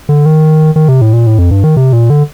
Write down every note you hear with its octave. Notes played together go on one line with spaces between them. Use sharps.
D3
D#3
D#3
C3
A2
A#2
A2
F2
G2
D#3
C3
A#2
D3